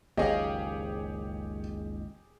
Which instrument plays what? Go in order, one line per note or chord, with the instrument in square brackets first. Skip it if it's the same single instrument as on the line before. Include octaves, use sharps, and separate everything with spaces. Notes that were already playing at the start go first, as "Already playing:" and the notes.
[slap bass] F#1 C#2 D#3 [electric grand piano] G4 G#4 [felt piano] C#5 [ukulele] D#5 F5